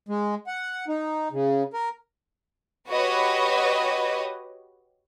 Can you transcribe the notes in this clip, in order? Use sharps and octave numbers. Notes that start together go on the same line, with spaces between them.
G#3
F#5
D#4
C#3
A#4
F#4 G4 B4 C#5 D#5